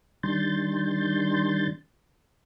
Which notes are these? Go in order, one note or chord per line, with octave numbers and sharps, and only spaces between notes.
D#3 G3 D4 C6 G6 A6